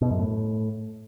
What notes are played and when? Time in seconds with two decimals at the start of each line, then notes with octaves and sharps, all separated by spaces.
0.01 B2
0.11 F#2
0.20 A2